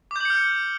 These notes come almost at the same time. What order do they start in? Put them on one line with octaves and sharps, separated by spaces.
D6 G6 F#7 C#7 F6